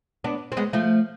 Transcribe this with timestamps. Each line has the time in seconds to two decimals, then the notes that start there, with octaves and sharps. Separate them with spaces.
0.24 B3 D4
0.52 C4
0.57 G#3 B3
0.73 F3 A3